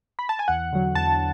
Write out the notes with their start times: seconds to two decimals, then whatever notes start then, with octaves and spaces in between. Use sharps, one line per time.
0.19 B5
0.29 A5
0.39 G#5
0.48 E2 F#5
0.73 D3 F#3
0.95 E2 A5